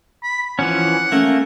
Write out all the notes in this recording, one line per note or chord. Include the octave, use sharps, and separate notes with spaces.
B5
E3 F3 C#4 F#5
A3 A#3 C#4